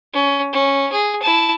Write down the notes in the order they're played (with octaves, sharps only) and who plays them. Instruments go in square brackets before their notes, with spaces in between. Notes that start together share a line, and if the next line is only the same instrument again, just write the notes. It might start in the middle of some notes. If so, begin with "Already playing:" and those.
[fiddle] C#4
C#4
G#4
E4 A5